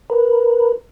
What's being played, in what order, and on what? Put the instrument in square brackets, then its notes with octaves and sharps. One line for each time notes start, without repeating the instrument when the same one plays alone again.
[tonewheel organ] A#4 B4